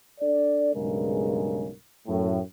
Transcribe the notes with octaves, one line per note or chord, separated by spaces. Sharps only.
D4 A4 D5
B1 G2 C#3 G#3 A#4
F#2 A2